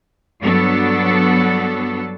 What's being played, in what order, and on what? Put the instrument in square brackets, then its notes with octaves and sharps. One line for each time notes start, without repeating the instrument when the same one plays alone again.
[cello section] G2 F#3 B3 D4 A4